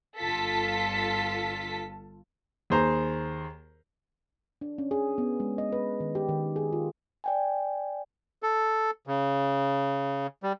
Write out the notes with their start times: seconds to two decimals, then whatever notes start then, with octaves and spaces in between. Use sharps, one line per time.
0.18 G1 F4 A4 A5 B6
2.70 D#2 G#4 C5 A#5
4.61 D4
4.78 C#4
4.91 G#4
5.18 B3
5.40 G#3
5.58 D#5
5.72 B4
6.00 D#3
6.15 G4
6.29 D#3
6.56 G#4
6.72 F4
7.24 D5 G5 G#5
8.43 A4
9.07 C#3
10.43 G3